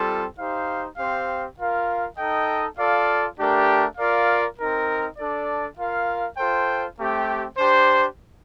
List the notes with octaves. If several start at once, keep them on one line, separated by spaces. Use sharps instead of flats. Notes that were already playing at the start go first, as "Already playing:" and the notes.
Already playing: G3 C4 F4 A4
D#4 G4 C5 F5
C4 G4 C5 F5
F4 A#4 F5
D#4 A4 D#5 G5
F4 A4 D5 F5
A3 D4 G4 A#4
F4 A#4 D5 F5
C4 D#4 A#4
D4 A4 D5
F4 A#4 F5
F4 A4 C5 G5
A3 C4 G4
D4 G4 C5